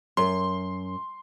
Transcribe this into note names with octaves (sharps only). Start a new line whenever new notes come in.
F#2 C6